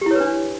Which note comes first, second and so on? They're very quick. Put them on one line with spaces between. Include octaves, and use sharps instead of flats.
G4 E4 C#5 B4 D4